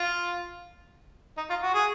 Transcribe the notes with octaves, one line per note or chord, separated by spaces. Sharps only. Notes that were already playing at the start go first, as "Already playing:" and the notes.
Already playing: F4
D#4
F4
F#4
G#4